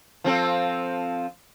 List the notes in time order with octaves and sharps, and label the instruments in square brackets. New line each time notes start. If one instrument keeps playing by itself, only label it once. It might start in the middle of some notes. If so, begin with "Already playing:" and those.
[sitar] F3 C4 A4